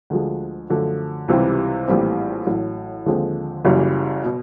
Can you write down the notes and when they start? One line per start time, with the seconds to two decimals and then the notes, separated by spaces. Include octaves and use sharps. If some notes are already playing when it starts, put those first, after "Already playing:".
0.10 D2 D3 F3 G#3
0.70 F#2 D3 F3 A3
1.28 C#2 C3 E3 G3 C4
1.88 A#1 A2 E3 G3 C4
2.47 A1 A2 F#3
3.06 D#2 D3 F3 G#3 C4
3.65 F#1 F#2 C#3 E3 G3
4.24 B2